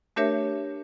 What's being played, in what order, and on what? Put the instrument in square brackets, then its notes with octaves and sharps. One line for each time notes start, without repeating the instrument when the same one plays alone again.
[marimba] A3 D4 G4 A#4 C#5 E5